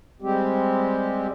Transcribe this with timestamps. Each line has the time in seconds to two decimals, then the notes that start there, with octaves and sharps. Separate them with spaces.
0.22 G3 G#3 C4 G4